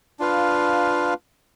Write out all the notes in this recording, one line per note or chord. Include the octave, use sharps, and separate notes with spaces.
D4 F4 B4 F5